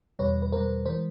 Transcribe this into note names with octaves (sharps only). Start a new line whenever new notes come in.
E2 B2 G3 B4 C#5
B4
E2 B2 G3 A#4 C5
E3 G#3 A#4 C5